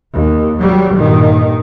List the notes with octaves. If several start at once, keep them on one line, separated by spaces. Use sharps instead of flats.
D#2
F#3 G3
G2 A#2 D#3